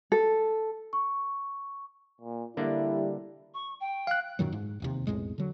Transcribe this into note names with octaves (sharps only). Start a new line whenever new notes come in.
A4
C#6
A#2
D3 G3 A#3 D4 E4
C#6
G5
F5 F#6
F#2 A#2 D#3 F#3
G#2
E1 D#2 C3
B1 F2 A2 G#3
D3 F#3